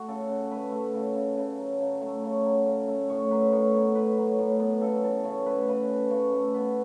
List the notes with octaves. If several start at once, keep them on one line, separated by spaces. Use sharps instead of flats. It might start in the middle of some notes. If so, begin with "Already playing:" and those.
Already playing: A3 F#4
C#3 A4
C#3
A3 B4
A3
C#3
C#3
C#3
F#3
C#3
A3
C#3 C#5
F#3
C#3
A3
A2 C#5
F#3 B4
A2 C#5
B3
A2 B4
F#3
A2
B3
C#3 A4
E3 A4
C#3 C#5
A3 B4
C#3 B4
E3
C#3 C#5
A3
B3 B4